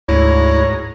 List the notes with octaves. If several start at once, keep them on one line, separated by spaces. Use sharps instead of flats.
D2 G#2 E4 C#5 A#5